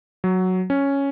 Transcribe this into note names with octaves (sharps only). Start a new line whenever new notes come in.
F#3
C#4